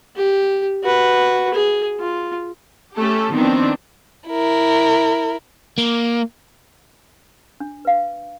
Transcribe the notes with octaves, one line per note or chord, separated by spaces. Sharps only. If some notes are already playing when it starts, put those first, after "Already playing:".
G4
F#4 B4
G#4
F4
A3 C#4 G4 A4
D#3 F3 B3 C4 D4 D#4
E4 A#4
A#3
D4
B4 F5